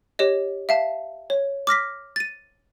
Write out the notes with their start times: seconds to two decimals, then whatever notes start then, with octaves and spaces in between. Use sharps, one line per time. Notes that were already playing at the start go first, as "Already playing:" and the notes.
0.19 G4 C#5 D#5
0.69 E5 F5 A5
1.30 C#5
1.67 D6 F6 A#6 B6
2.16 A6 D#7